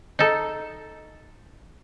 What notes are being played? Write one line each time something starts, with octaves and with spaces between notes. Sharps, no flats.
D#4 A4